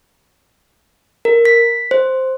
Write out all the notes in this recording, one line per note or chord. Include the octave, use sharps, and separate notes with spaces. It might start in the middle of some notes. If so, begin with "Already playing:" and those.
A#4
B6
C5